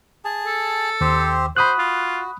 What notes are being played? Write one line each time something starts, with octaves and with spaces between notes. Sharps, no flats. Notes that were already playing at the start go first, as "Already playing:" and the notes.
G#4 A5
A4
D#2 C4 G4 C5
F#4 C5 B5 D#6 F#6
F4